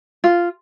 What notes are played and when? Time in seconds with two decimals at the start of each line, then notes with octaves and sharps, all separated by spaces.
0.24 F4